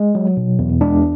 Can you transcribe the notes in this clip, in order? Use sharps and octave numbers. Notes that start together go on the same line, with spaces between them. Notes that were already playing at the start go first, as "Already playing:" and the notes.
Already playing: G#3
F#3
B2
E2
G#3 D4